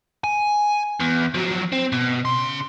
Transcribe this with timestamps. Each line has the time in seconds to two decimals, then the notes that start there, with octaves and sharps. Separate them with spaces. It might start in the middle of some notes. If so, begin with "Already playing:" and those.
0.24 G#5
1.00 E2
1.35 F3 F#3
1.73 C4
1.93 B2
2.25 C#3 C6